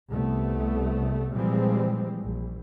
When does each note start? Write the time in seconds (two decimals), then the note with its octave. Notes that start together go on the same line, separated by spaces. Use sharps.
0.10 C2 A3 B3
1.34 A#2 E3 F3 G3 G#3 C4
2.21 A#1